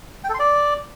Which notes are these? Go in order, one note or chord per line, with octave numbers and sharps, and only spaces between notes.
G5
A4
C6
D5